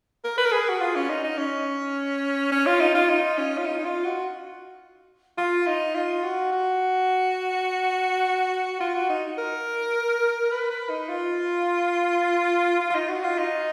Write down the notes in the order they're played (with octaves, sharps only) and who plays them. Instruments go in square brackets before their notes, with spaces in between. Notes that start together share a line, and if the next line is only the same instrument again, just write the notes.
[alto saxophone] A#4
B4
A#4
G#4
F#4
F4
C#4
D#4
D#4
C#4
C#4
F4
D#4
F4
D#4
C#4
F4
D#4
D#4
F4
F#4
F4
D#4
F4
F#4
F#4
F4
F#4
D#4
A#4
B4
B4
D#4
F4
F4
F4
D#4
F#4
F4
D#4